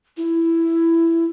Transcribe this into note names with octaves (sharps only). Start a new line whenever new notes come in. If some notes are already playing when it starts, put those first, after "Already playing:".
E4